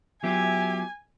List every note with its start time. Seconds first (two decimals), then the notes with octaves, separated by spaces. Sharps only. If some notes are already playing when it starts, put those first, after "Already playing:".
0.24 F#3 B3 F4 G4 E5 G#5